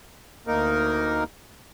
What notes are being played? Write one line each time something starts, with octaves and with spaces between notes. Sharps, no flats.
D2 A#3 D#4 A#4